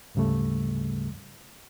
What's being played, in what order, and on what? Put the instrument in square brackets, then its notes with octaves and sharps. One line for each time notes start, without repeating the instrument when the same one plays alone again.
[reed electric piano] D2 G#2 C#3 G3 A3